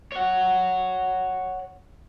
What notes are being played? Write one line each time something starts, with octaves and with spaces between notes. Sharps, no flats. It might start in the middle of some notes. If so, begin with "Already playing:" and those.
C#5 F#5